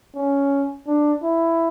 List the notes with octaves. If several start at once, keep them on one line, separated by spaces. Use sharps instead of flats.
C#4
D4
E4